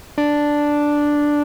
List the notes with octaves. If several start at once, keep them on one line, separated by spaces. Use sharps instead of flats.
D4